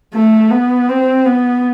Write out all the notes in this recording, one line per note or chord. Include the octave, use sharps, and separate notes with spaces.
A3
B3
C4
B3